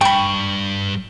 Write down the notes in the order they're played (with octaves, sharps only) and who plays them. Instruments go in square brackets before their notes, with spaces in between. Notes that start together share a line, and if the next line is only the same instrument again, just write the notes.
[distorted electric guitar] G2 [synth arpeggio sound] G5 [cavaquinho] B5 C#6